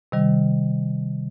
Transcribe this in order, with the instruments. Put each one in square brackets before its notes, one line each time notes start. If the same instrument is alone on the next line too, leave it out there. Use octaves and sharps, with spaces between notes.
[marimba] C3 D#3 G3